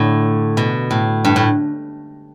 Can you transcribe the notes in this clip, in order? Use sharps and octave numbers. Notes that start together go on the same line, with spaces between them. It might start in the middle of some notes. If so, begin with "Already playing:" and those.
Already playing: A2 D3
B2
A2
G2
A2